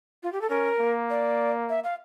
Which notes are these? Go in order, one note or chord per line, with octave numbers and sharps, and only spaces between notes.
F4
G4
A4
C#4 A#4
A#3
D5
E5
F5